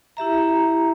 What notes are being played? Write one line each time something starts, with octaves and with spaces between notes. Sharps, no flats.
E4 G4 E5 A#5